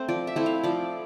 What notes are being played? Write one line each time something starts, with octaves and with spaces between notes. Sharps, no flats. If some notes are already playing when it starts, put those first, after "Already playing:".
Already playing: A3 C4 C5
F3 D5
E5
A3 C4 E4
F5
F3 D5